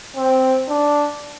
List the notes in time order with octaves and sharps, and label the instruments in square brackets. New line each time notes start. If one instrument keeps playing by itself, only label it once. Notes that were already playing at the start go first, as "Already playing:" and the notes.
[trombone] C4
D4